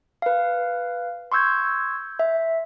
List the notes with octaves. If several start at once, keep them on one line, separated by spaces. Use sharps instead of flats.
B4 F5
C6 C#6 E6 G6 G#6
E5